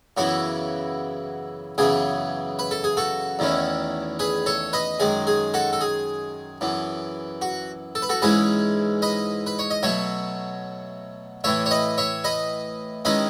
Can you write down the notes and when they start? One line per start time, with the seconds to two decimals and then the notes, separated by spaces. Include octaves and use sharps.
0.17 F#2 C#3 E3 B3 E4 F#4
1.78 F#2 C#3 E3 B3 G#4
2.59 B4
2.71 A4
2.84 G#4
2.97 F#4 A4
3.39 E2 D#3 A3 C#4 E4
4.19 G#4 B4
4.46 A4 C#5
4.73 B4 D#5
5.00 F#2 D#3 G#3 G#4
5.27 G#4
5.54 F#4 A4
5.73 A4
5.81 G#4
6.61 F#2 E3 B3
7.42 F#4
7.95 A4
8.02 B4
8.09 F#4 A4
8.22 G#2 E3 G#3 C#4 E4 G#4 B4
9.02 B4 D#5
9.46 B4
9.59 C#5
9.70 D#5
9.83 B2 F#3 A3 C#5 E5
11.44 A2 E3 A3 C#5 E5
11.66 C#5
11.71 B4 D#5
11.98 C#5 E5
12.24 B4 D#5
13.05 D#3 G#3 C#4 E4 B4 D#5